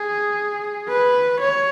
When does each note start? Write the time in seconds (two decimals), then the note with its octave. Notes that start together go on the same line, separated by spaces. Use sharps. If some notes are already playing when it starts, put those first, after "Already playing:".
Already playing: G#4
0.88 B4
1.40 C#5